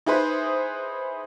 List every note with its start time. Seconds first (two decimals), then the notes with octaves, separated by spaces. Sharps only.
0.06 D#4 E4 G#4 B4 C5